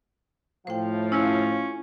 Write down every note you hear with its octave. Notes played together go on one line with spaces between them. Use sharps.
A2 F3 C5 F5 G5
C#4 E4 F4